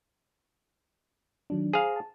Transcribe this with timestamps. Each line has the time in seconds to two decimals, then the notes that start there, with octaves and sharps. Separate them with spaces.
1.50 D#3 F#3 D4
1.73 G#4 C5 F5 A#5
1.96 A5